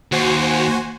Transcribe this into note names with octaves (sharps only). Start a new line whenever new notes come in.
D#2 F#4 C5 G#5